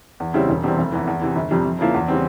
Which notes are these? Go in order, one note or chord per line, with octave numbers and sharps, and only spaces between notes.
E2
C#3 G3 C4 E4
E1
E2 C3 G3 C4
F1
E2 E3
E2
C3 E3
G1
F2 C3 G3
F2
C#3 F3 A#3 E4
E2
C#3 E3 G3 C4